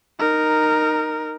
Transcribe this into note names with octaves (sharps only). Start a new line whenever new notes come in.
D#4 A#4